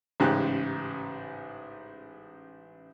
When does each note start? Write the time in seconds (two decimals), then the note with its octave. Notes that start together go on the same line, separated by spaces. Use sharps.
0.20 A1 G#2 C#3 G4 F#6